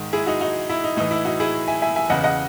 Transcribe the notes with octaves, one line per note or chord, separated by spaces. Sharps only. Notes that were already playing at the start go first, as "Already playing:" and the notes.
Already playing: G#2 D#3
E4 G#4
D#4 F#4
D#4 F#4
E4
D#4
A2 E3 D#4
E4
D#4 F#4
E4 G#4
E5 G#5
E5 G#5
E5 G#5
E2 C#3 E3 D#5 F#5
D#5 F#5